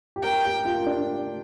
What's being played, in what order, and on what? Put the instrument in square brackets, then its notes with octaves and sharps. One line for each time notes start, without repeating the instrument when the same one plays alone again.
[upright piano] G4
[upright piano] A#4 [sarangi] G5
[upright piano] G4
F4
D4